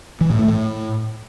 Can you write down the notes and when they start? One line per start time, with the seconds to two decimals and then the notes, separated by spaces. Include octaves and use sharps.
0.21 E3
0.30 A2
0.39 A3
0.48 A2